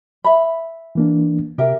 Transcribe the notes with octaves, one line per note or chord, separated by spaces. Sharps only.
E5 B5
E3 A#3 D4
C3 G4 A#4 E5